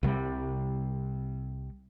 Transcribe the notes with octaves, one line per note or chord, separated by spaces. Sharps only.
C2 C3 G3